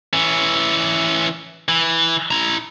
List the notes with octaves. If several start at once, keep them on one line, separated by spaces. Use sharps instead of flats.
E3 C#4
E3
E4 A#5